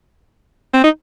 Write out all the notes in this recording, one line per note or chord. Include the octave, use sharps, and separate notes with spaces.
C4
D#4